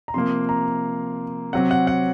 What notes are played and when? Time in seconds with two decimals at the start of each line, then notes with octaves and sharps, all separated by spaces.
0.08 A#5
0.14 C3 F3 A#3 C6
0.49 A#5
1.53 C3 F#3 C4 F#5
1.71 F#5
1.87 F#5